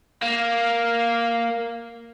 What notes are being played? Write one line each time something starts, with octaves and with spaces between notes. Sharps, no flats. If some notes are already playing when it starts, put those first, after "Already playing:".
A#3 F5